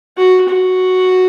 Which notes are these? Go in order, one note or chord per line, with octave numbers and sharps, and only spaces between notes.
F#4
F#4